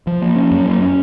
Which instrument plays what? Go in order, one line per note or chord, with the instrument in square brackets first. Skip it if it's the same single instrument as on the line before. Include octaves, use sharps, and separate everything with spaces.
[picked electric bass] F3
A#3
C#4
F#2
A#3
C#4